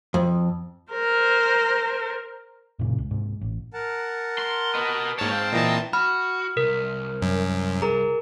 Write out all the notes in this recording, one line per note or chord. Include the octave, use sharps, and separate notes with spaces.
F2
A#4 C5
F#2 A#2 C#3
C#2
G#2 C3
A1
A#4 F#5 A5
C6
B4 D#5
G#2 A#3 C#5 A5 F6
C4 F5 G5
A#2 E3 D#5 A5 A#5
F#4 B5 F6
C2 A#4
F#2
G#4 A#4 A#5